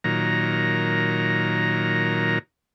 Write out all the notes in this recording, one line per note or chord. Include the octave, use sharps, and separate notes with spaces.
A#2 D#3 F#3 A#5